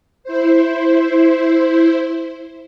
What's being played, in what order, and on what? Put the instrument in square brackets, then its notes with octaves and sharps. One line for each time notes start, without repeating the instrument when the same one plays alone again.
[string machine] E4 C5